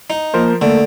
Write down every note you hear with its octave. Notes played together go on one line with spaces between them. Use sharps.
D#4
F3 A#3 A#4 C5
D3 A3 A#3